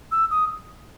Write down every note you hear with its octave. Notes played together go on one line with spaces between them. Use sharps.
E6
D#6